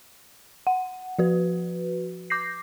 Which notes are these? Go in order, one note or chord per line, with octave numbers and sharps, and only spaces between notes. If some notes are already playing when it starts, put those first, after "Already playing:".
F#5
F3 F#4 B4
D6 G6 A#6 C7